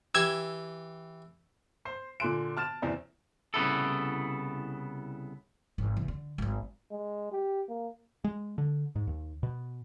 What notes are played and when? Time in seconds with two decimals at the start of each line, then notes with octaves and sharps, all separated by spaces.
0.15 E3 G4 E6 G#6
1.85 C5 C7
2.20 A#2 D3 G#5 C6 F#6 D7
2.57 A5 F6 A6 E7
2.82 E2 C3 C4 D5
3.54 C2 C#3 B3 E4 A4
5.78 G#1
5.97 E2 C3
6.08 D3
6.38 G#1 F#3
6.91 G#3
7.32 G4
7.69 A#3
8.24 G#3
8.58 D3
8.96 G#2
9.07 D#2
9.43 B2